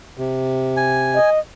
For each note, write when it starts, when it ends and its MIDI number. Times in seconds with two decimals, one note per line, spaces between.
0.18 1.19 48
0.77 1.30 80
1.15 1.39 75